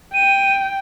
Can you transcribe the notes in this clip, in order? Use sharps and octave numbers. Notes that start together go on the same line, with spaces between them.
G5 D#7